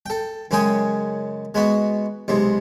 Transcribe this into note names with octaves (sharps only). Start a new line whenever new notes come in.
A4 G5
F#2 C#3 G#3 G5 G#5 D#6
G#3 B3 F#4
B1 C3 G#3